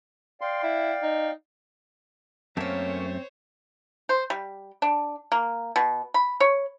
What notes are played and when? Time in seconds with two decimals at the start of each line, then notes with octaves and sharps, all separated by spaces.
0.41 D5 F5 G5 C6
0.63 E4
1.03 D#4
2.57 F#2 A3 A#3 C4 C#4 C5 C#5 A5
4.09 C5
4.30 G3
4.82 D4
5.32 A#3
5.76 B2
6.14 B5
6.40 C#5